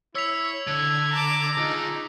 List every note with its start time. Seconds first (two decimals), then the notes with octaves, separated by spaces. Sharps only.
0.15 E4 C#5 E6 B6 F7
0.67 D3 G#6
1.11 A5 A#5 D6
1.57 D#4 F4 G#4